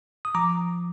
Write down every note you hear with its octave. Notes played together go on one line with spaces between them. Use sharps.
D#6
F3 A#5 D6